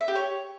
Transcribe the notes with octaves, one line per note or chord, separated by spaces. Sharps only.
E5
G4
C#5